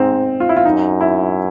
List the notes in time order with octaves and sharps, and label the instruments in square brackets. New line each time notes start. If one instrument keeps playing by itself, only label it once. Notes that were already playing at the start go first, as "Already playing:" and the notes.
Already playing: [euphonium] G#2 [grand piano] C4 D#4
[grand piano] F4
E4
F4
[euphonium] F#2 [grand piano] D#4
[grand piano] E4